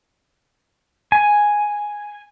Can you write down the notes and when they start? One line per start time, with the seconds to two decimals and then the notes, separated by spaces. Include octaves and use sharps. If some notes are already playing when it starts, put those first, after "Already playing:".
1.12 G#5